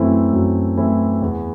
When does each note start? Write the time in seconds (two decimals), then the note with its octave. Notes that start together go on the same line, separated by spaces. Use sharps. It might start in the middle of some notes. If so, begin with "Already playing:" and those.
Already playing: F#2 E3 A3 C4 E4
0.33 F#2
0.77 E3 A3 C4 E4
1.22 E2